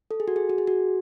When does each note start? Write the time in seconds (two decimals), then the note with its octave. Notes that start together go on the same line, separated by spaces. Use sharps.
0.11 A4
0.20 G#4
0.28 F#4
0.36 G#4
0.49 F#4
0.58 G#4
0.67 F#4